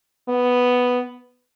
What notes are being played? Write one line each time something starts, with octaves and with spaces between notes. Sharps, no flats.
B3